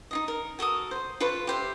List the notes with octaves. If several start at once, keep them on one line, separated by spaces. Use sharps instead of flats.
D#4 F4 D#5
A#4
F#4 A4 A#4 D#6
C5
F4 A4 B4 C#6
G4 C5 E5